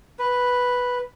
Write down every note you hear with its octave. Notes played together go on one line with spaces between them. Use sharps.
B4